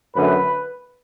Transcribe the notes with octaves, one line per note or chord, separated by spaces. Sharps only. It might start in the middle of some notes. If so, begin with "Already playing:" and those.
F#2 D3 A3 B4